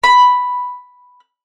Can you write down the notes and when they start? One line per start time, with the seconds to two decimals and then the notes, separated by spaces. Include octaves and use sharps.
0.04 B5